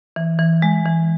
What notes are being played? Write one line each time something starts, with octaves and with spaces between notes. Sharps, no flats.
E3
E3
G#3
E3